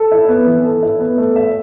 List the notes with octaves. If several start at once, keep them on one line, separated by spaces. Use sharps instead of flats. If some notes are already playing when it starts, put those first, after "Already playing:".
Already playing: A4
E4
B3
E3
A4
E4
B3
A3
E5